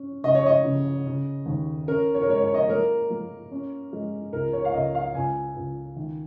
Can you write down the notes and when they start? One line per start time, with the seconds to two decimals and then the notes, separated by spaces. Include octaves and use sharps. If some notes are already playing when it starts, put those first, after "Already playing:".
Already playing: C#4
0.24 C#3 D#5
0.35 C#5
0.46 D#5
0.64 C#3
1.06 C#3
1.46 D#2
1.88 C#4 A#4
2.15 C#5
2.22 A#4
2.29 G#3 C#5
2.42 C#5
2.54 D#5
2.62 C#5
2.69 A#3 A#4
3.10 A#3
3.51 C#4
3.93 G#3
4.33 C#2 A#4
4.53 C#5
4.65 F5
4.73 C#2 D#5
4.95 F5
5.15 C#2 G#5
5.56 C#2
5.96 D#3